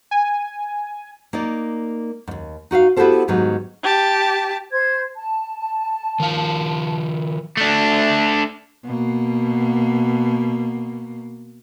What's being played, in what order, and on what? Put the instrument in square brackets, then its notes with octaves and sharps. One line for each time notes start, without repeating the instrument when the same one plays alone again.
[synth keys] G#5
[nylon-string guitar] A#3 D#4 D5
D#2 G#2
D#4 F#4 E5 F5
B3 E4 F#4 G4 A4 C5
G#2 D#3 F#3 G3 B3 D#4
[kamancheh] G4 A5
[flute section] C5 G#6
A5
[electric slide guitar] D#3 F3 F5
[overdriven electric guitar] A3 D4
[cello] B2 A#3